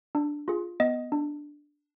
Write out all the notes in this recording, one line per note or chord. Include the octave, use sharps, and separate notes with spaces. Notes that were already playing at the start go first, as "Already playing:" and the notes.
D4
F4 G#4
B3 D#5
D4